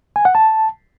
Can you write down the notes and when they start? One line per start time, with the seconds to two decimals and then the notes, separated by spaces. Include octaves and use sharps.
0.16 G#5
0.25 F#5
0.35 A5